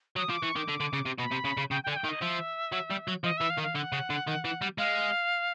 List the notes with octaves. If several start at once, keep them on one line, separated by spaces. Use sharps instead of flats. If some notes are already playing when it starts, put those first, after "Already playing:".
F#3 D#6
F3 D6
E3 C#6
D#3 D6
D3
D3
C#3
C3
B2 B5
C3
C#3
C#3
C#3 G5
G5
D3
G#5
G5
D#3
D#5
F3 E5
F#3
G3
F#3
F3 D#5
E3 E5
F5
D#3
F5
D3 F#5
C#3
D3
D#3
E3
G3
G#3 F5